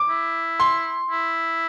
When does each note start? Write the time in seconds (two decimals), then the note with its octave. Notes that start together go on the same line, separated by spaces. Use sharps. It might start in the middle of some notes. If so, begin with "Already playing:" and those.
Already playing: D6
0.09 E4
0.60 C6
1.10 E4